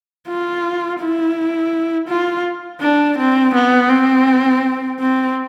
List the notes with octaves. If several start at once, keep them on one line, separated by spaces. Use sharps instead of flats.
F4
E4
F4
D4
C4
B3
C4
C4